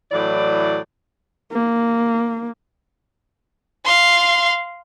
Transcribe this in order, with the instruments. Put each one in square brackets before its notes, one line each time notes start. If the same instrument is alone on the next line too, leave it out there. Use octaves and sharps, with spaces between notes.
[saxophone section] A2 E3 F#3 D5
[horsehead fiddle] A#3
[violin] F5 C6